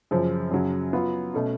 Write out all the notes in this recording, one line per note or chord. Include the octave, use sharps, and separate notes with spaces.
F#2 C#3 F3
F#2 C#3 F#3
F#3 B3 F4
B2 A3 C#4